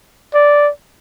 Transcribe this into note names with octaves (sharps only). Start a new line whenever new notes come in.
D5